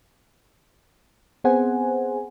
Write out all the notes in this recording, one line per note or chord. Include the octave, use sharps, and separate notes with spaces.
B3 C4 G#4 C5 F#5 G#5